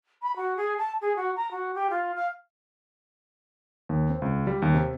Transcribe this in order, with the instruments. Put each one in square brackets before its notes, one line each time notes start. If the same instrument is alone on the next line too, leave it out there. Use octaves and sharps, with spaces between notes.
[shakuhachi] B5
F#4
G#4
A5
G#4
F#4
A#5
F#4
G4
F4
F5
[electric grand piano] D#2
C4
C#2
G3
D#2
C3